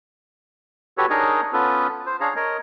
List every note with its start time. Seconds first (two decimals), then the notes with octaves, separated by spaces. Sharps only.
0.98 F#4 G4 A4 B4 C#5
1.10 D4 D#4 G#4 A#4 C#5 D#5
1.53 B3 C#4 F4 A4 B4
2.06 C5
2.21 D4 G#4 C#5 F5 A#5
2.36 A#4 C#5 D#5